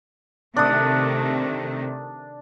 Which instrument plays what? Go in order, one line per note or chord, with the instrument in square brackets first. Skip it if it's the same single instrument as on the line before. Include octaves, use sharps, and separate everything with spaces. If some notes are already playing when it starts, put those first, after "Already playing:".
[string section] C3 D#3 A3 [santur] D4 D#6